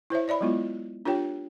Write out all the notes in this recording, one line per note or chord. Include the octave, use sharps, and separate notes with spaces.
E4 C5 C#5 E5
C#5 D5 E5 B5
F#3 G#3 B3 E4 F4
D4 F4 G4 A#4 C#5 G5